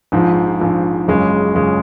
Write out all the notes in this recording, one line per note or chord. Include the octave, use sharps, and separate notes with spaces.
A#1 G#2 F3
A#1 G#2 F3
F#1 F#2 C#3 G#3 C#4
F#1 F#2 C#3 G#3 C#4